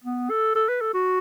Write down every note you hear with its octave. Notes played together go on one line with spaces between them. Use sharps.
B3
A4
A4
B4
A4
F#4